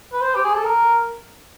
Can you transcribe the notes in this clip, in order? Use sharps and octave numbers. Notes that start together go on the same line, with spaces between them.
B4
C5
G4
G#4
A4
A#4